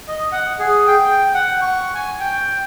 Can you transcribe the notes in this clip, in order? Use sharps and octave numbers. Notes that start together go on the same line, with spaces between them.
D#5
F#5
G#4
G5
F#5
C#6
G#5
G5